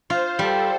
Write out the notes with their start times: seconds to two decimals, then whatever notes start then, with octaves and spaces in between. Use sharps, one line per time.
0.10 F4 C5
0.38 G3 A4